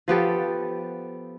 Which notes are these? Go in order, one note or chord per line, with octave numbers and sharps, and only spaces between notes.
F3 B3 G4 A4